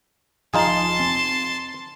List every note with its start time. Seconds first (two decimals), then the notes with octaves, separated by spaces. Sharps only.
0.54 F1 F3 D#4 F4 G#4 A5 C6
0.99 C4